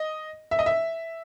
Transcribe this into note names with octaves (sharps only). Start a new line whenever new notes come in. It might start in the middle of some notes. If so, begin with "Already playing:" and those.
Already playing: D#5
E5
D#5
E5